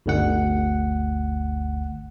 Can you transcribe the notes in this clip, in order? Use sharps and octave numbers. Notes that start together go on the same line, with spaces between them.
G1 D2 F#5